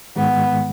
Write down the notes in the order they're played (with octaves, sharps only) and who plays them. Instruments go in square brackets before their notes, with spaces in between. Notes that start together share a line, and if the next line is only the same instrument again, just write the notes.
[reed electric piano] G#2 D#3 G#3 [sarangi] B3